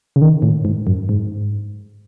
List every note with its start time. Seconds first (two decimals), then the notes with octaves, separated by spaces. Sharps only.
0.16 C#3
0.21 D#3
0.42 A2
0.65 G#2
0.87 F#2
1.09 G#2